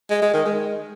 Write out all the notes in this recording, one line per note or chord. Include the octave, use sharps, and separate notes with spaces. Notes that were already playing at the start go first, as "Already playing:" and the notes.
G#3
G#3
D#3
G#3